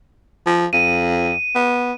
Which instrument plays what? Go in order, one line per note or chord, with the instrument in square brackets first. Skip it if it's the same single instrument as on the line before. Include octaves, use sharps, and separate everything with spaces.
[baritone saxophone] F3
[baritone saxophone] F2 [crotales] D#7
[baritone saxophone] B3